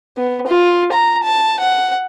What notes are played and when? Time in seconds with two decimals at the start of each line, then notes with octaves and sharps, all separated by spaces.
0.17 B3
0.47 F4
0.92 A#5
1.23 A5
1.59 F#5